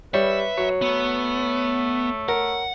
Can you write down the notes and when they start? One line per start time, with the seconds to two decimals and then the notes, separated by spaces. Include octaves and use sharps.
0.14 G3 B4 C#5 E5
0.57 F#3 C#5
0.82 A3 B3
2.29 A#4 F#5